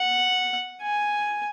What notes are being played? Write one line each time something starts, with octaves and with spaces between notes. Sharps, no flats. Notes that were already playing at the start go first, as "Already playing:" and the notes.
Already playing: F#5
G#5